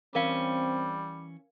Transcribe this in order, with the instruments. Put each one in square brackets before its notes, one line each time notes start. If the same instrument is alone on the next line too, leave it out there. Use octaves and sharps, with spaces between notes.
[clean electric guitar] E3 C#4 [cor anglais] G3 [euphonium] C4 [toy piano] A#4 F5